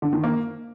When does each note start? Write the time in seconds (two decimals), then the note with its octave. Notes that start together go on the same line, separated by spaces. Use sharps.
0.02 D3
0.13 D#3
0.24 A#3